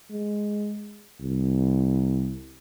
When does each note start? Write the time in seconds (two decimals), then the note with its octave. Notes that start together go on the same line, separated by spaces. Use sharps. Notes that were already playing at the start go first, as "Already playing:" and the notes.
0.11 G#3
1.21 C2